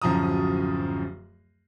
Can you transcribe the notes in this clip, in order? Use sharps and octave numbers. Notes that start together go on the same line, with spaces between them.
D1 F#2 F3 A#5 D#6